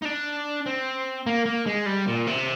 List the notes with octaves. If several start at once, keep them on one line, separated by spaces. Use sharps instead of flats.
D#4
D4
C4
A#3
A#3
G#3
G3
A#2
C3